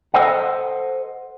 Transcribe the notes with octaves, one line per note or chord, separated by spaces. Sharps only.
A4 C5 D#5 F#5